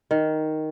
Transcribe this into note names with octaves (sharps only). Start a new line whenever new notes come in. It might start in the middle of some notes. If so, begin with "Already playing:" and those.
D#3